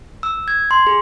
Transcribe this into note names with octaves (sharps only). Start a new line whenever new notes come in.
E6
G#6
C6
G#4